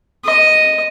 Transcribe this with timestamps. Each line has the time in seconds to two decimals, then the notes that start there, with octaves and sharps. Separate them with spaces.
0.25 D#5